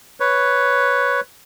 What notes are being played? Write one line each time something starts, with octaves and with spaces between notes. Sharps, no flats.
B4 C#5